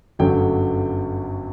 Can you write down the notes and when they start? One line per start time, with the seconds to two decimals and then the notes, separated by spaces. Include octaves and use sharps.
0.19 G1 F#2 F#3 A3 G5